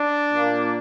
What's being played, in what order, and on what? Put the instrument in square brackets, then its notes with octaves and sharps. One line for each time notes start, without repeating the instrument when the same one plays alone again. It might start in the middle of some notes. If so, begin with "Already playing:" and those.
Already playing: [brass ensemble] D4
A#2 A#3